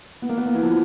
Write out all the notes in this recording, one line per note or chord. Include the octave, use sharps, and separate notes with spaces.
B3
A#3
B3
A#3
E3
F3